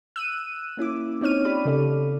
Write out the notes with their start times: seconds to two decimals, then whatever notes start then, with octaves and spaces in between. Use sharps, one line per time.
0.16 E6 F#6 D#7
0.77 A#3 C#4 E4 D6
1.21 C4 D#4 C#5 F6 D#7
1.45 F4 G4 D5 B5
1.65 C#3 A4 D5